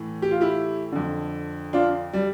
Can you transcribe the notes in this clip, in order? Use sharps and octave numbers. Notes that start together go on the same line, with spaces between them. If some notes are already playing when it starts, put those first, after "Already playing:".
Already playing: A2 E3
G4
F4
E4 G4
F2 D3
D4 F4
G3